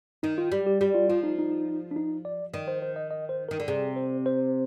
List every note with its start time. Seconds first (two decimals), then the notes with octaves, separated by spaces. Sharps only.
0.23 D#3 D#4
0.38 F4
0.52 G3 G4
0.67 G4
0.81 G3 G4
0.95 F4
1.09 F3 F4
1.23 D#4
1.38 D#4
1.91 D4
1.96 D#4
2.25 D5
2.54 D#3 D5
2.68 C5
2.82 C5
2.96 D#5
3.11 D#5
3.29 C5
3.49 D#3 A#4
3.60 D3
3.68 C3 G#4
3.96 C5
4.26 C5